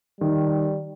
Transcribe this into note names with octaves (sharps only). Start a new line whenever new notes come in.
D#3 G3